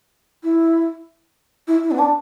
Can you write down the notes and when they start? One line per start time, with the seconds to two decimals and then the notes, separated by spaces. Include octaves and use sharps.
0.43 E4
1.67 E4
1.83 E4
1.91 B3
1.98 D4